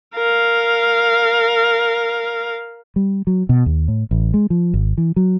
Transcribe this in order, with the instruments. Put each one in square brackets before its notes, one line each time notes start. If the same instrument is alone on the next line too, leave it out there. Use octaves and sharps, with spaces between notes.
[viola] A#4 F5
[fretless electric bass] G3
F#3
B2
D#2
A2
A1
G#3
F3
G#1
E3
F#3